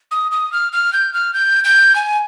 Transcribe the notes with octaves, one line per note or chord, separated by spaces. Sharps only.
D#6
D#6
F6
F6
G6
F6
G6
G6
G#5